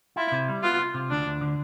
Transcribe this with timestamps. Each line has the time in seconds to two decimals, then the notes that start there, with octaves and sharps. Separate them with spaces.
0.16 E4 F4
0.32 C3
0.48 G3
0.63 B3 F4
0.79 F4
0.94 C3
1.10 D2 D4
1.26 D2
1.41 D3